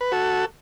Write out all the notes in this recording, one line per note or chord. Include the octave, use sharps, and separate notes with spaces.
B4
F#4 A4